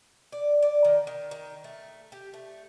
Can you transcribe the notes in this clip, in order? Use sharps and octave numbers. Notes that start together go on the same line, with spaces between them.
D5
D5
D#3
D#3
D#3
A3
G4
A3